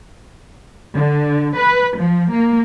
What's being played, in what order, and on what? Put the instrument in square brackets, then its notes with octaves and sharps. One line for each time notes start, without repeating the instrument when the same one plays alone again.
[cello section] D3
B4
F3
A#3